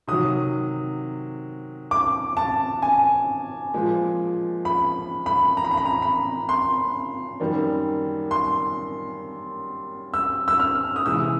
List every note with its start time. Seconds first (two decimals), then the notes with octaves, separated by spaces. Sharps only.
0.08 C3 D#3 F#3 D#6
1.91 D6
2.37 A5
2.82 G#5
3.74 A#2 F3 G#3
4.65 B5
5.26 B5
5.57 A#5
5.64 B5
5.71 A#5
5.77 B5
5.85 A#5
6.02 B5
6.49 C6
7.40 F#2 D#3 G3 A#3
8.31 C6
10.14 E6
10.48 E6
10.60 F6
10.96 D#6
11.06 C3 E3 G#3 E6